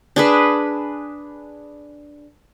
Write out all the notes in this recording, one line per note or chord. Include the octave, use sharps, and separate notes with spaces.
D4 G#4 B4